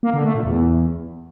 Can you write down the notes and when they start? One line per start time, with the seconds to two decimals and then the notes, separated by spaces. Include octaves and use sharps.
0.03 A#3
0.14 D3
0.24 A3
0.35 A#2
0.46 E2